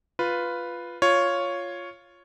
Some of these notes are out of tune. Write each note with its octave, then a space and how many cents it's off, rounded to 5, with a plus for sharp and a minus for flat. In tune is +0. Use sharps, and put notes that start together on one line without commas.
F4 +0 B4 +0
F4 +0 C#5 +0